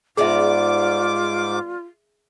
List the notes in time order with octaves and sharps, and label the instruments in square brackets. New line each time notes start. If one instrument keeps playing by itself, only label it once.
[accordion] G#2 D6 [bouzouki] G3 B3 D5 [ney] F4 [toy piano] G#4 E5